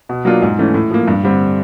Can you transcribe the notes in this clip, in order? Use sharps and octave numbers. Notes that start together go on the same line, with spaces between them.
B2
F#3 A#3 D4 F4
G#2
E3 A3 C#4
A2
F3 A#3
G2
D3 G3 C4